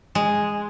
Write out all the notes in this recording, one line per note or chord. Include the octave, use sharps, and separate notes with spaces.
G#3